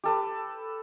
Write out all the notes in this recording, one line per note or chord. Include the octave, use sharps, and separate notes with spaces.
G4 A4 B4